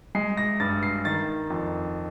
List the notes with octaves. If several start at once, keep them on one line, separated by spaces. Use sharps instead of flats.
G#3 C7
A#6
G2 A6
C7
D#3 A6
F2